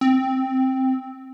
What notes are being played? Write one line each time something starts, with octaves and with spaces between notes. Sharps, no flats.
C4